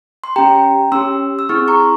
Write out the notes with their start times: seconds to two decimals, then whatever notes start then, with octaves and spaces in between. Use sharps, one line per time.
0.24 C6
0.36 C#4 G4 G5 A#5
0.92 C#4 G4 C6 E6
1.39 E6
1.49 C4 E4 G#4 C#6 F6
1.68 A#5 C#6
1.80 C6